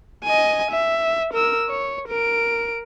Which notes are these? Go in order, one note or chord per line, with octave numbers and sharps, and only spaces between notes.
D#5 G#5
E5
A#4 E6
C#5
A#4 D7